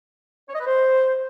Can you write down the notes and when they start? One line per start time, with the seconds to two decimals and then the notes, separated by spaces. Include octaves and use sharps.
0.49 C#5
0.55 D#5
0.61 B4
0.67 C5